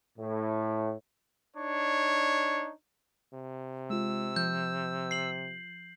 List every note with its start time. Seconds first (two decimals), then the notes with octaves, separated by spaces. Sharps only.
0.18 A2
1.57 D4 D#4 C#5
3.33 C3
3.90 G#3 F4 E6
4.36 F3 G6
5.11 C7 F#7